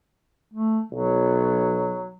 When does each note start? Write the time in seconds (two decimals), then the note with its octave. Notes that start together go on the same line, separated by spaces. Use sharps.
0.54 A3
0.92 B1 F#3